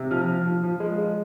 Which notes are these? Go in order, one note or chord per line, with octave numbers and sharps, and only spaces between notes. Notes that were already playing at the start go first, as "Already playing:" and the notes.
Already playing: C3
F3 F6
F3
F3
F3
G#3
G#3